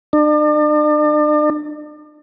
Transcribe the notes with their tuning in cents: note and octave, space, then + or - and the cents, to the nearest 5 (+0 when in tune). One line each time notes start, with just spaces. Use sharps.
D4 +40